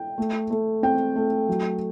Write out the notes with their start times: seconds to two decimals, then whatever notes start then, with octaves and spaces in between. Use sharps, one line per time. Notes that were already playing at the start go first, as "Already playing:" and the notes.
Already playing: G5
0.18 A3
0.50 A3
0.83 C4 G5
1.16 A3
1.48 F#3